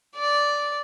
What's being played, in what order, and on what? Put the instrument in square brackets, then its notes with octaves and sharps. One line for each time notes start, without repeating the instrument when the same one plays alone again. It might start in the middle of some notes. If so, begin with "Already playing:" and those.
[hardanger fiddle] D5